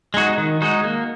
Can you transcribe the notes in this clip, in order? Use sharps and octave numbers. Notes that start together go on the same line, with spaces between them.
G#3 D#4 F#4
D#3
G#3 D#4 F#4
A#3